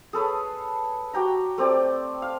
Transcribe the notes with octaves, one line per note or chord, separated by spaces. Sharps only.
G#4 A4 B4 C#5
F#4 G4 G5 A#5
A3 C4 G4 D5
F5